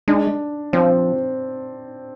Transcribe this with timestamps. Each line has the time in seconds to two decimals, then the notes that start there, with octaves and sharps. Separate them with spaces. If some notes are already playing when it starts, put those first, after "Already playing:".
0.08 G#3 D4
0.73 F3 C4